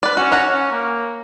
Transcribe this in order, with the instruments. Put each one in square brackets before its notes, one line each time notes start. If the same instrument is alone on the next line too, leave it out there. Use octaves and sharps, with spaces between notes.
[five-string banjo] B4 D5
[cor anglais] C#4 [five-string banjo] F#4
[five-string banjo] C#5 F#5 A#5
[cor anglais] C#4
A#3